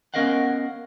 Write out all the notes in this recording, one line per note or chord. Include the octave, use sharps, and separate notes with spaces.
B3 C#4 A#4 D#5 F5 F#5